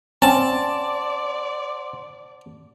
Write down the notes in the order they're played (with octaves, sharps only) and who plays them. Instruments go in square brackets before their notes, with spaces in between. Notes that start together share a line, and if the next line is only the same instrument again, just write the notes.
[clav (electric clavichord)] C4 C#4 [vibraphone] C5 F#5 C6 [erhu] D5 [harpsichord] A5